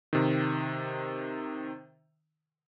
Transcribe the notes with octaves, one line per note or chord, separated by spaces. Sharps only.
C3 D#3